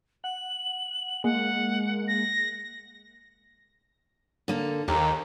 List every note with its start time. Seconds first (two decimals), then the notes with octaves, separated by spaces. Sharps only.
0.24 F#5 F#7
1.24 G#3 A#3 F#5
2.08 A#6
4.48 D3 A#3 A4
4.88 D#2 G4 A#5